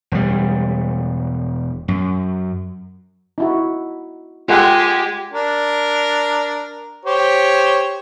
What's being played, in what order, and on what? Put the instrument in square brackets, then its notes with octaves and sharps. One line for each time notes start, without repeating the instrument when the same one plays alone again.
[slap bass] E1 G3
F#2
[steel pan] D#4 E4 F#4
[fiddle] G#3 G4 [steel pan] F4 A4 F#5
[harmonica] D4 A#4
G4 C5 C#5